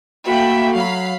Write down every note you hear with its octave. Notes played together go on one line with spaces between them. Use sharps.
A3 A#3 F#4 E5 G5 B5
F#3 F5 B5